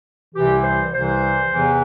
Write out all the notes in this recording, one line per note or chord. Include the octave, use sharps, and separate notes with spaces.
C2 C3 E3 G4
C5
C2 C3 E3 C5
E2 C3 E3